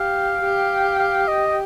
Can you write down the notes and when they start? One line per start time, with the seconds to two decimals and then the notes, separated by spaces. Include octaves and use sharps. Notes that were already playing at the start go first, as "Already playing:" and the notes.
Already playing: G4 F5
0.44 G4
0.99 F5
1.28 D#5